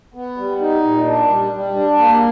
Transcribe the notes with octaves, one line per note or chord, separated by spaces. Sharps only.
B3
G3
D#4
A#2
D4
G3
G3
D4
A#3